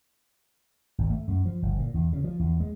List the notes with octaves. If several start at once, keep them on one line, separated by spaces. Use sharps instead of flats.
G#1
A3
F#2
F3
G1
A#2
E2
C#3
F3
E2
G#3